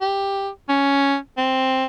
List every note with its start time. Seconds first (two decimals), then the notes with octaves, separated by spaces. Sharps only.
0.01 G4
0.69 C#4
1.37 C4